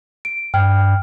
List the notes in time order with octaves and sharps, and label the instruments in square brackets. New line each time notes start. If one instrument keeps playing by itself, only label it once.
[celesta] D7
[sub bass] G2 [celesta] G5 F6